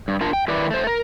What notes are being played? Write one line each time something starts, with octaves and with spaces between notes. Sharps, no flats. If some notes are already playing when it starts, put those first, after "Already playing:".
G2
D4 F4 A#4 A5
G5
D#3 E4 B4 D5
A3 C5
A#4